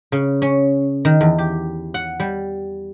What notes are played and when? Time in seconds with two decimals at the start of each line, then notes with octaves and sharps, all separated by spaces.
0.12 C#3
0.42 C#4
1.05 D#3
1.21 E2
1.38 G4
1.94 F#5
2.20 G3